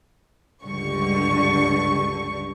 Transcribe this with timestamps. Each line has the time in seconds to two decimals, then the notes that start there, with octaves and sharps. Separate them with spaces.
0.64 C#2 G2 D3 G3 C#6